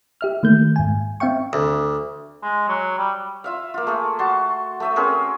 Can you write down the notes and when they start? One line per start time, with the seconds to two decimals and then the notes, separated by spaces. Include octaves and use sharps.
0.21 G4 E5 F6
0.43 D#3 A3 A#3 G6
0.76 G#2 G#5
1.20 C4 E5 F5 G5 C#6
1.53 D2
2.43 G#3
2.68 F#3
2.98 G3
3.44 F4 E5 F5
3.74 A#3 F4
3.87 A3 A#3 G#4
4.19 F#4 A5 C6
4.80 A3 E5 D#6
4.96 C4 C#4 G#4 A#4